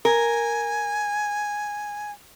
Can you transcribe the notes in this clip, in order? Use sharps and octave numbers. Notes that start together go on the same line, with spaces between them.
A#4 G#5